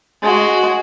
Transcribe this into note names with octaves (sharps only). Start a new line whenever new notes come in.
G#3 F#4